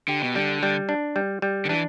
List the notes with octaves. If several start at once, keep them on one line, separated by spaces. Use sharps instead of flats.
D3 G4
B2
D3 G3
G3
D4
G3
G3
D3
E3 D4